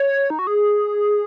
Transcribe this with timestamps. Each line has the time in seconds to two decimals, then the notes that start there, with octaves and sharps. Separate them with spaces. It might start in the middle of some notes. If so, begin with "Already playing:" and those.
Already playing: C#5
0.30 D#4
0.39 F#4
0.47 G#4